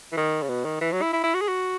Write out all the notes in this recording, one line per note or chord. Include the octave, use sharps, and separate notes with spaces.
E3
D#3
C#3
B2
D#3
E3
F#3
E4
E4
E4
F#4
G#4
F#4